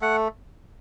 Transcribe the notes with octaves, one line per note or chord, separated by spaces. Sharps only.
A3 F#5